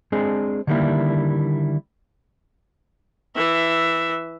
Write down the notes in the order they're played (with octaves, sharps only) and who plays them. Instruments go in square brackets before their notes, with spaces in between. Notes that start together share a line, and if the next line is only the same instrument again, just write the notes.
[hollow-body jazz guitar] G#3 C4 D4 G#4
D3 D#3 G3 A#3 E4
[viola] E3 E5